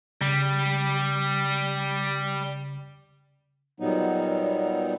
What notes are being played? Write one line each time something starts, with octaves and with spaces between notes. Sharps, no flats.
C#3 G3
A#2 F#3 G3 B3 D#4